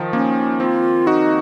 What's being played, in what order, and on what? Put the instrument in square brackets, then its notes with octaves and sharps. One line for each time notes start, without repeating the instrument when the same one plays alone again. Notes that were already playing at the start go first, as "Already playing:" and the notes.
Already playing: [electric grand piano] D#3 F3
[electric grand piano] A#3 [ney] C#4
[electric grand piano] C4 [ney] F4
[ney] D#4 [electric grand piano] F#4